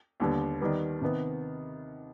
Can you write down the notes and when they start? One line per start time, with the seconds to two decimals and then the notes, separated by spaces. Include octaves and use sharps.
0.20 D#2 D3 G3 B3
0.61 D#3 G3 B3
1.01 C3 D#3 B3